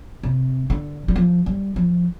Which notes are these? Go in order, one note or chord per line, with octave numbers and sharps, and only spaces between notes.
C3
D3
G3
F3
G3
F3